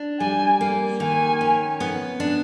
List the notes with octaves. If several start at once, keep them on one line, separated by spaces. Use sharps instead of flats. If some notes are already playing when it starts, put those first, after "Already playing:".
Already playing: D4
G3 G#5
A#3
D#3 G#5
C#4
B3
D4